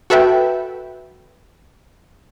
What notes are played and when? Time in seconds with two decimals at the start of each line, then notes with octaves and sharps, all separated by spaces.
0.10 F#4 A4 B4 E5 G5